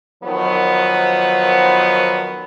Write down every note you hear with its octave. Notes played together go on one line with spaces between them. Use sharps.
D#3 F3 F#3 B3